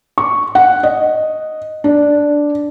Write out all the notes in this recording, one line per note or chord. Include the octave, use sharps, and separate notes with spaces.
C#6
F#5
D#5
D4